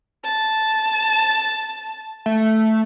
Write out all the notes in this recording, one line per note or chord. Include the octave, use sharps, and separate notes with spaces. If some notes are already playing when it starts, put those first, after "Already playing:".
A5
A3